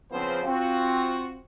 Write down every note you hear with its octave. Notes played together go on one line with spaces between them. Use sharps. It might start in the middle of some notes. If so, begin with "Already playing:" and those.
C#3 F3 B3 C4 C5
C4 F4 F#4